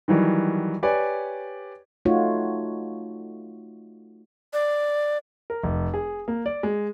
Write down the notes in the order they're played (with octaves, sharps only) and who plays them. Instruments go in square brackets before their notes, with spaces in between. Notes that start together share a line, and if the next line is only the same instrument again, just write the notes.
[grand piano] D#3 E3 F#3 G3
G4 B4 C#5 D5 G#5
[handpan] A3 D#4 F4 F#4 C#5
[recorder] D5
[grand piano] A#4
F1
G#4
A#3
D5
G#3